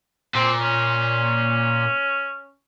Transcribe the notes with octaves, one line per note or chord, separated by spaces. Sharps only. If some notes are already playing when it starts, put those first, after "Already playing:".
A#2 C4
C#4